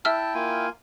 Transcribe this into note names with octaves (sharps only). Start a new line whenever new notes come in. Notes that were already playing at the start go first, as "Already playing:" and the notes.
E4 E5 G5 A5 E6 F6
A#3 F4 G#5